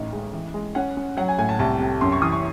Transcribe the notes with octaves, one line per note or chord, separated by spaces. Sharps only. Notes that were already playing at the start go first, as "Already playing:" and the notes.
Already playing: A1 D#4 D#5
G#3
E3
G#3
C#4 F#5
C#4
F#3 F#5
G#5
A2 G#5
A5
C2 A5
C3
F#2 C6
C#6
E3 D#6
C#6